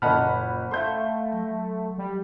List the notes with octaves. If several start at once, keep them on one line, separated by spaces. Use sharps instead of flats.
F#1 A#2 C5 D#5 F#5 A5 B5 F6
A3 E5 F5 C6 G6
F#3
G3